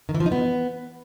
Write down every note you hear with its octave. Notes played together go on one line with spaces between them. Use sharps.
D#3
E3
F3
D#4
B3